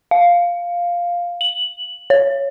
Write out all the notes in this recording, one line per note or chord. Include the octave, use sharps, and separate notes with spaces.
F5
F#7
C#5